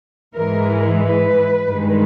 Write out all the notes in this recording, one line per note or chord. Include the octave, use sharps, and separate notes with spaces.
G#2 E3 G#3 A#4
B4
G2 D#3 G#3